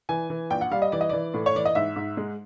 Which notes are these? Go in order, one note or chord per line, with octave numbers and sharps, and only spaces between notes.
E3 G#5
E3
A#1 G5
F#5
G3 F5
D#5
E3 D5
D#5
E3 D5
A2
C#5
E3 D5
D#5
G#2 E5
G#2
G#3